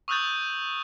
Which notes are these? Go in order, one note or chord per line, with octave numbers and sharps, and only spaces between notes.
C#6 D#6 E6 F#6 G6 A6